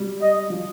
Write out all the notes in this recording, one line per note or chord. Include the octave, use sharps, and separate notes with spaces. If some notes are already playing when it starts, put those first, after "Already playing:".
Already playing: G3
D#5
F3